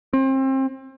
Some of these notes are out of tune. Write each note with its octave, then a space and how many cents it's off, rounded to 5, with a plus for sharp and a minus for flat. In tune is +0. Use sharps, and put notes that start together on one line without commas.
C4 +30